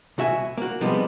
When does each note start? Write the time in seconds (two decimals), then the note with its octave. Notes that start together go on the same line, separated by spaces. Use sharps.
0.18 C2 F#4 E5 G#5
0.58 A#3 F#4
0.81 C3 F3 G3 G#3 B3